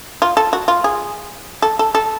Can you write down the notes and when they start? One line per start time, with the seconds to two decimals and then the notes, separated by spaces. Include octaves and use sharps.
0.22 F4
0.37 A4
0.53 F#4
0.68 F4
0.84 G#4
1.62 A4
1.79 A4
1.95 A4